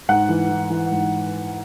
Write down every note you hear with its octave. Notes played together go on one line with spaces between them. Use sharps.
G#2 F#5
E3
E3
E3
G#2